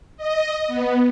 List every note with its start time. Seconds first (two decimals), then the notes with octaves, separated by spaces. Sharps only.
0.17 D#5
0.68 B3